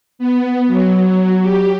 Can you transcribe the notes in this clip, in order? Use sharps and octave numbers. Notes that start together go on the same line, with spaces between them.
B3
F#3
G4